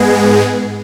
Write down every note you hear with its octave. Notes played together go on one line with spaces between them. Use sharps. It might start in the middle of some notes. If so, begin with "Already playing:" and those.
Already playing: G#2 G#3 B3 G#4